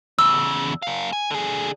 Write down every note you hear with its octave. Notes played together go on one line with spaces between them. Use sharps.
E2 C#3 E6
F#2 F5
G#5
D3 G#4